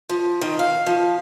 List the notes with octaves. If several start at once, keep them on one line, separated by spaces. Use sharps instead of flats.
F3
D#3
F5
F3